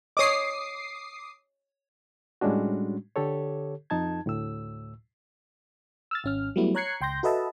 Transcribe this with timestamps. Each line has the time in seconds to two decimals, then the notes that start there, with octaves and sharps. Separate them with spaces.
0.17 C#5 D#5 D6 D#6 C7
2.41 A2 G3 G#3 C#4 D4 F#4
3.16 D3 G4 A4 C#5
3.90 F2 D#4 A5 G#6
4.26 D2 A2 E6
6.11 E6 F6 A6
6.24 G#1 C#4 F6
6.56 F#3 G3 A3 B3 E4
6.75 C#5 A#5 F#6 G#6 C7 C#7
7.01 C#2 G5 C6 G6 A#6
7.23 F#4 A4 B4 D#5 E5 A5